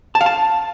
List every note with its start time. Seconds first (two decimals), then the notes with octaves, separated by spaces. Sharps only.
0.15 A5
0.21 F5
0.26 A5